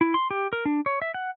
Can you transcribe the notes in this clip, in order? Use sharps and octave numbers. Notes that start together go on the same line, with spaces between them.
E4
C6
G4
A#4
D4
C#5
E5
F#5